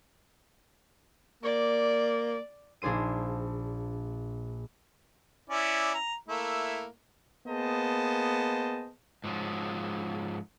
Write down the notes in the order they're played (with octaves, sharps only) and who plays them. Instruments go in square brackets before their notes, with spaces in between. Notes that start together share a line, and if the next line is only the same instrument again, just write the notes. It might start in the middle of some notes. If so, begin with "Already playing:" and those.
[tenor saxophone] A#3 [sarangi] D5
[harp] A#1 D4 G#4 C5 D#7
[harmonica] C#4 E4 D5
A#5
A3 A#3 E4
[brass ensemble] A#3 B3 G#4 C5 D#5 A5
[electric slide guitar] G#2 F3 F#3